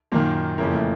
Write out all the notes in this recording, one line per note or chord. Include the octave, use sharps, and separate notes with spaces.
F#2 A#2 D#3 A#3
F2 A#2 C#3 E3 A#3
A3